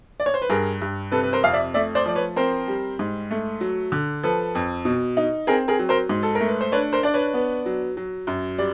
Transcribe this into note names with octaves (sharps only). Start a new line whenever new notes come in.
D5
C#5
C5
B4
G2 G#4 A#4
G2
C3 A4 B4
B4
A#4 C5
F2 F5
D5 E5
A3 D5 E5
C5 D5
F3 D5
B4 C#5
C4 A#4 C5
G3
G#2
A3
F#3
D3
F3 A4 B4
F2
B2
D#4
C4 G#4 A#4
G#4 A#4
F#3
A#4 C5
G#2
A4
A#4
A3
B4
C5
D4 B4 C#5
A#4 C5
D4 D5
B4 C#5
B3
F#3
F#3
F#2
G3 D5